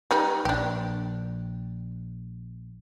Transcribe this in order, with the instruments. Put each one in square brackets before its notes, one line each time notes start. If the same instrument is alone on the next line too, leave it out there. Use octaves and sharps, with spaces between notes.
[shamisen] G3 D#4 B4
[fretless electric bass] A#1 [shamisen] D4 G4